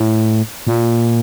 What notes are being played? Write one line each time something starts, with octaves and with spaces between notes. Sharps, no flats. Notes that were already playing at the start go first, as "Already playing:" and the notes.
Already playing: A2
A#2